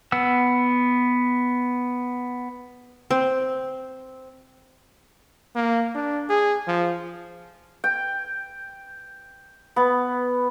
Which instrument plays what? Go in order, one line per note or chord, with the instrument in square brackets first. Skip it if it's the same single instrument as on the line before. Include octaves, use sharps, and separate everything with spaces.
[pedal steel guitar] B3 F#5 E6
[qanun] C4
[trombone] A#3
D4
G#4
F3
[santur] G5
B3